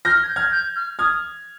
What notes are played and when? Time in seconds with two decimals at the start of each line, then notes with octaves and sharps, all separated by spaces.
0.05 F6 G6 A#6
0.23 G#6
0.28 G6
0.36 F6 G#6
0.52 G6
0.76 F6
0.99 D#6 F6 G#6